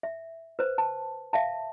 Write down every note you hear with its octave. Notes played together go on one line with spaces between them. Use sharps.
E5
B4 C5
A5
E5 F5 A5